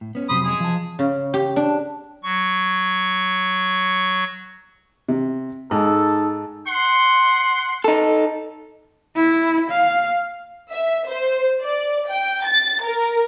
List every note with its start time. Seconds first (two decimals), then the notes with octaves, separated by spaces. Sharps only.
0.01 A2
0.15 B3 C#4
0.29 F2 C3 F#3 C5 B5 D#6
0.44 G#3 G#4
0.60 F3 A5
0.99 C#3
1.34 G4
1.56 D4
2.23 F#3 C#6
5.08 C3
5.71 G#2 D#4 A4
6.66 F#5 C6
7.84 D#4 A4
9.16 E4
9.70 F5
10.73 E5
11.08 C5
11.63 D5
12.09 G5
12.46 A6
12.85 A#4